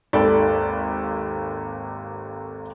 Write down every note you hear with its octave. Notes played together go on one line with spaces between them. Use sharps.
G#1 D#2 A4 D5 B5